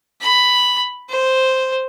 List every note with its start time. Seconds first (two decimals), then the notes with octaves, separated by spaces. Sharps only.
0.21 B5
1.09 C5